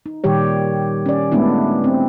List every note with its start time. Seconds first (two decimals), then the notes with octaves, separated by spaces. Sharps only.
0.06 D#4
0.24 A#2 D#3 G3 G4 C#5
1.06 C#4 D5
1.32 G#3 A3 B3 D4 E4
1.84 C4